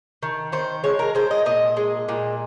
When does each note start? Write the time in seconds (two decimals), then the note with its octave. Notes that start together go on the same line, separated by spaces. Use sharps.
0.23 D#3
0.52 D#3 C5
0.84 G#3 C#5
0.99 A#4
1.15 G#3 C5
1.31 D#5
1.46 A#2 D#5
1.77 G#3
2.09 A#2